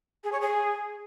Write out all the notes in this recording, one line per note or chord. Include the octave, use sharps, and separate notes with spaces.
G#4
C#5
G#4